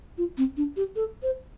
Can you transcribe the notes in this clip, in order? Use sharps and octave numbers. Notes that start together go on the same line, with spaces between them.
F4
C4
D4
G4
A4
C5